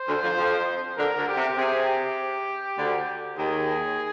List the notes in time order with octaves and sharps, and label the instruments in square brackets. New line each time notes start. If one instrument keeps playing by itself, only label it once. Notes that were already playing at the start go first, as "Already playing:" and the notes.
Already playing: [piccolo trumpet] C5
[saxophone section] D2 D3
F2 F3
F2 F3
[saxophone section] D2 D3 [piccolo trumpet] A#4
[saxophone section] D2 D3
[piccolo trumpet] G4
[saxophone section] C3
[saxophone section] C3 [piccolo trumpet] G#4
[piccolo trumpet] G4
[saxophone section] D2 D3
[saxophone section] D#2 D#3 [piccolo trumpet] G#4